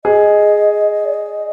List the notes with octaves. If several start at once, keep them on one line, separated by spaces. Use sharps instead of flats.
G#4 D#5
D5
D#5